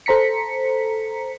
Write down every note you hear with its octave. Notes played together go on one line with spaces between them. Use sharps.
A4 C5 A#5 B6 C#7